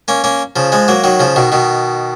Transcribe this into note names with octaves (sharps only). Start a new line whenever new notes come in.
A#3 C#4
A#3 C#4
C#3 F3
F3 G#3
F#3 A#3
D#3 F#3
C#3 F3
B2 D#3
B2 D#3